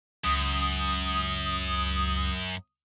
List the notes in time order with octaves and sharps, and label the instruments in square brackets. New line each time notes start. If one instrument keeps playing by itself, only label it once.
[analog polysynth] C#2 D#6 [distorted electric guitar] F#2